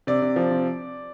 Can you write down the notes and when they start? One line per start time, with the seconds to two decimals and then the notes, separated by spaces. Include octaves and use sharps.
0.07 C3 D5
0.22 C3
0.36 F3
0.51 C3